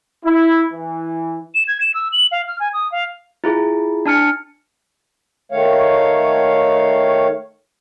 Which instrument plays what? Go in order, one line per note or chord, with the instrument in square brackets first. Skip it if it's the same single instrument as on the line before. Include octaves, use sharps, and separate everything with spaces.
[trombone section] E4
E3
[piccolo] E7
G#6
E7
E6
F#7
F5
F6
G#5
D#6
F5
[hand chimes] E4 F4 G#4
D4 A5 F6 C#7
[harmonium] D#3 A3 C#5 F5